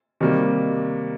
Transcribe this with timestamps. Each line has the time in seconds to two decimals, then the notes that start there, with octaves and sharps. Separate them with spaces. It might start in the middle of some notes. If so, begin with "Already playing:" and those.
0.20 C3 D#3 G3 A#3